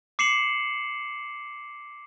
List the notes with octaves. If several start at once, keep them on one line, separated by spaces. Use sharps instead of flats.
D6 C7 C#7 E7 F#7